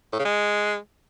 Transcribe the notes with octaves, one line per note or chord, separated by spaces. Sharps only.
A2
C#3
G#3